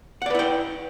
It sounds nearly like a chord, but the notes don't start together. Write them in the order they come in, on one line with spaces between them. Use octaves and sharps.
F#5 D5 B4 E4 G5